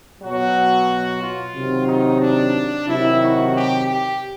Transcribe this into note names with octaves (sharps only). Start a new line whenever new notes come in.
B2 F#3 F#4
F4
C3 D#3 F#3
D#4
D4
C3 D#3 F#3 E4
F#4
G4
G4